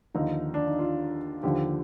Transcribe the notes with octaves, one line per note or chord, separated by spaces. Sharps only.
D#2 D3 F3 D#4
D4
D#4
F4
D#2 D3 F3 G4